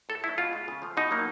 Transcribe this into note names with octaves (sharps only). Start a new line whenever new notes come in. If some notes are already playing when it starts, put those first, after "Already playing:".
A2 A4
F3 A3 E4
B2 F4
G#3
C#3
F3 A3
B2 D#4
F#3 A#3